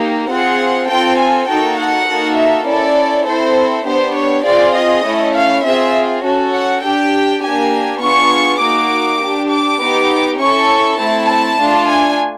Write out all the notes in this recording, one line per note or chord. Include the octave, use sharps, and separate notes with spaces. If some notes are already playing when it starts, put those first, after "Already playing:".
Already playing: A#3 D#4 G4
C4 F4 G#4 F#5
C4 F4 A4 G5
G#5
A#3 D#4 F#4 A4 G5
F#5
A#3 D#4 F#4 A4
E5
C#4 E4 A4 D5
C4 E4 A4 C5
B3 D4 G4 C5
C#5
C4 F4 G#4 D5
D#5
A3 C#4 E4
F5
C4 F4 G#4 E5
C#4 F#4 A4
F#5
D4 G4 G5
A#3 D4 G4 G#5
B3 D4 F4 G#4 C#6
A#3 D#4 F#4 D6
D4 G4
D6
B3 D#4 G4
C#4 E4 A4 C#6
A3 C4 E4 A5
A5
A3 D4 F4
G#5